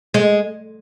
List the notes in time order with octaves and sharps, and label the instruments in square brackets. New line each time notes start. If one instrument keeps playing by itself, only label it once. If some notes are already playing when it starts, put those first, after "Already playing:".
[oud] G#3